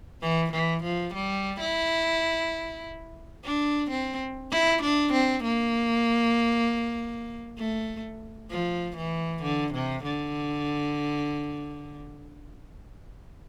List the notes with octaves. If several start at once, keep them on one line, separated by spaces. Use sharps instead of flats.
E3
E3
F3
G3
E4
D4
C4
E4
D4
C4
A#3
A3
F3
E3
D3
C3
D3